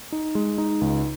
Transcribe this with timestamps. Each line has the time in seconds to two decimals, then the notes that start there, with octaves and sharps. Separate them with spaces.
0.12 D#4
0.35 G#3
0.58 D#4
0.81 C#2